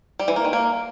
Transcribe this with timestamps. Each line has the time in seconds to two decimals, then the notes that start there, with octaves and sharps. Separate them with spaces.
0.19 G3
0.28 E3
0.36 A#3
0.45 D#3
0.53 A#3